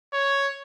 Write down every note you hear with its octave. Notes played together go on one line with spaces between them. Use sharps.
C#5